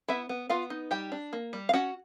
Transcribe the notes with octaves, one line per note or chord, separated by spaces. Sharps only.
B3 E4 E5
B3
B3 F4 F5
D#4
G3 G4 G5
D4
A#3
G3
F5
C#4 F#4 F#5